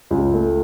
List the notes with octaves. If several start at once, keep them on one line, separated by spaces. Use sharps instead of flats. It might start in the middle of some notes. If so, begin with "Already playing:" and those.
C#2
A3